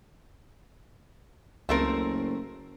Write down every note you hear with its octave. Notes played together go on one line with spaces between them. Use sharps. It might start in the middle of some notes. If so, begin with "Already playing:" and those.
F#1 C#2 A3 C4 A#4